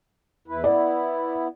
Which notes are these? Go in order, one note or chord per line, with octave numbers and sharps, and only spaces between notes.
E2 E4 B4
B3 E4 D5